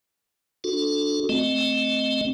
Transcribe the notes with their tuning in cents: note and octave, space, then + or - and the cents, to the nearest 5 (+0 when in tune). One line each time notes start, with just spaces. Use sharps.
D4 +0 F#4 -35 A4 +0
A3 +0 C4 +0 D#5 -5